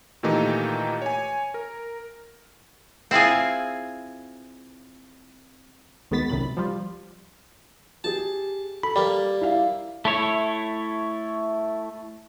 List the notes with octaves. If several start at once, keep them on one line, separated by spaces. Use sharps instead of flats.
A#2 D#3 E3 A3 D#4 G4
C#5 G#5
A#4
C4 E4 F4 G#4
D2 D#3 G#3 B3 A6 B6
C2 F#2 C3 D#3 B5
F3 G3 F4
G4 G#4 A5
A4 B5
G3 A#3 D5
E4 F5
A3 E4 C#5